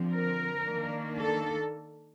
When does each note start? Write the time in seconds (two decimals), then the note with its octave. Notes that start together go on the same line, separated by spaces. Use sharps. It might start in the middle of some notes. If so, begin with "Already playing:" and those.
Already playing: D3 F3 C4
0.13 A#4
0.66 D#3 A#3 D4
1.19 A4